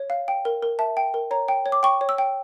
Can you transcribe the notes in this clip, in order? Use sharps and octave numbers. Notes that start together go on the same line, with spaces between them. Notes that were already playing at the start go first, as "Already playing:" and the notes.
Already playing: C#5
F5
G5
A#4
A#4
E5 A5
G5
A#4
C#5 A#5
G5
C#5
D6
G5 C#6
C#5
E6
G5